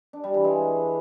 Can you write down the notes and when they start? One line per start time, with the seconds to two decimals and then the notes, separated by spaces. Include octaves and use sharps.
0.13 D4
0.24 G3
0.34 E3
0.44 G#3